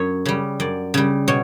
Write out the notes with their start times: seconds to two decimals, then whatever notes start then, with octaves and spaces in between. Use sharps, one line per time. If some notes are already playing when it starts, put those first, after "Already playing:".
Already playing: F#2 C#5
0.26 C#3 G3
0.60 F#2 D5
0.94 C#3 G3
1.28 B2 C#5